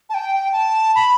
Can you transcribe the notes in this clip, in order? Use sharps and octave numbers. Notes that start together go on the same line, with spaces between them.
A5
G5
A5
B5